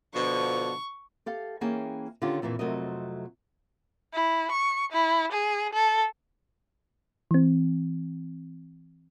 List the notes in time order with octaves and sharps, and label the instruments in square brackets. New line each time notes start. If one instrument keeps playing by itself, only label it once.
[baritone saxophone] B2 [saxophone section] D3 F3 [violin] C#6
[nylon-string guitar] G4 A4 F5
E3 A#3 C#4 G#4 G5 A5
D3 D#3 C#4 F4 G4
F2 A#2 E3 A3 A#3
F2 C3 F#3 A3 A#4 D#5
[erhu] E4
C#6
E4
G#4
A4
[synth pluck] E3 C4